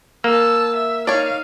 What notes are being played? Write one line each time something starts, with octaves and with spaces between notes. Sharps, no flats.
A#3 A5 E6
E5
D#4 C#5 D5 F5